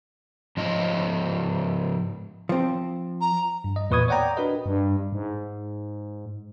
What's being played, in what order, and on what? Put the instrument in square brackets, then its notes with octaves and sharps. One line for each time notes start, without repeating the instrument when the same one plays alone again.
[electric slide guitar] G#2 F3 D#5
[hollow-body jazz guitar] F3 C4
[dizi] A#5
[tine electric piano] G2
D#5
E2 A#2 B4 C#6 D#6 G#6
C#5 D5 F#5 G5 A#5
D4 F#4 A#4 B4 D#5
[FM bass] G2
G#2